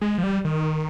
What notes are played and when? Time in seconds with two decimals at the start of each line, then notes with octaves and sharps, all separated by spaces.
0.02 G#3
0.18 F3
0.23 G3
0.45 D#3